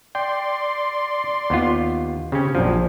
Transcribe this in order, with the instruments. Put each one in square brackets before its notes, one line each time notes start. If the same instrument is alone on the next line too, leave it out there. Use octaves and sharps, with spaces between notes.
[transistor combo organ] D5 C6 [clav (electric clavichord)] G5
[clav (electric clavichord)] D#2 B3 F4
[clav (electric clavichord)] C#3 C#4 [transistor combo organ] C4 G4
[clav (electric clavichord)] A#1 F3 [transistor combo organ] F2 F#3 D4